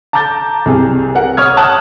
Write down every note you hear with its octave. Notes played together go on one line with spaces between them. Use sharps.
A5 A#5 D6 G6 A6
C2 C3 G#4
A#4 F#5
C#5 C#6 D#6 F6 G#6
F#5 A5 D#6 F#6